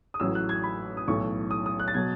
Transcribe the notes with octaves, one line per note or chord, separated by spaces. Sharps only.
D#6
A1 A2 F#3 E6
F#6
G#6
B5
D#6
B1 A2 E3 C#6
D#6
D#6
F#6
A6
B2 F#3 G#6